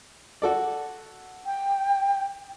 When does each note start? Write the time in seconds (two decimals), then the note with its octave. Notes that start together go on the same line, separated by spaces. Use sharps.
0.42 F#4 A4 D5
1.45 G5